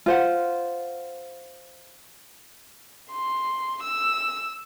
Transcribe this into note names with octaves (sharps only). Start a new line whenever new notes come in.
F4 C5 F#5
C6
E6